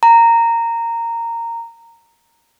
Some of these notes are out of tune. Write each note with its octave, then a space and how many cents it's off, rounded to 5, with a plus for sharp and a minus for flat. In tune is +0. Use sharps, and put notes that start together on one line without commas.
A#5 -10